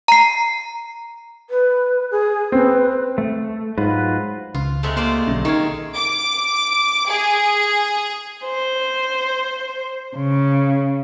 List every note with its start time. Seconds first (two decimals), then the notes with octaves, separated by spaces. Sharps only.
0.08 A#5 C7
1.50 B4
2.11 G#4
2.52 C4 B4
3.18 A3
3.78 G#2 F#3 F4 B4
4.55 C#2 C#3 F4
4.83 C3 G#3 A3
4.97 A#3 F4 C5 D5
5.28 B1 D3 F#3 C#4
5.45 D#3 D#4 F5 C#6 G#6
5.96 D6
7.11 G#4
8.43 C5
10.16 C#3